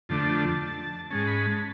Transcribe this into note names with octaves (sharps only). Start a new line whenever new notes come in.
F2 D3 F3 A3 D4 A5
G#2 G#3 C#4 A5
B5
A5